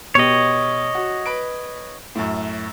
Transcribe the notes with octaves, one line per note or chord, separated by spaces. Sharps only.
B2 G4 C#5 D#5
F#4
B4 D7
F#2 A2